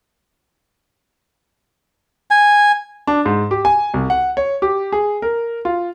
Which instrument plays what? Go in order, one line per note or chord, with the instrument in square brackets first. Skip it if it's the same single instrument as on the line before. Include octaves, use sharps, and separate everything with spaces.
[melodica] G#5
[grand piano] D4
G#2
G4
G#5
C2
F#5
C#5
G4
G#4
A#4
F4